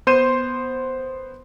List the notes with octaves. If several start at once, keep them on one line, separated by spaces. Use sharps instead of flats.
B3 C5 C6 G6 D#7 E7